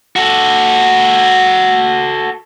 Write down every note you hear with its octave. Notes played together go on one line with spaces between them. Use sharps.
F#4 A4